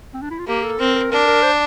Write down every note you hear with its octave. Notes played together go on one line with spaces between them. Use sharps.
C4
D4
E4
F4
A#3 G4
A4
C4 A#4
A#4
D4 A#4
A#4
C5